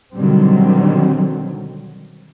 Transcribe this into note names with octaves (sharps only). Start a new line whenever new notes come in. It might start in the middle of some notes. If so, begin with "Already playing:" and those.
B2 D3 D#3 F#3 G3 C4